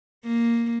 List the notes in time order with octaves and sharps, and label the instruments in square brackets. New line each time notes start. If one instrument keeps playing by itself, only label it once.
[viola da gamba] A#3